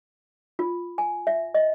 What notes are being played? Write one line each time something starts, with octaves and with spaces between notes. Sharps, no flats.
F4
G#5
E5
D#5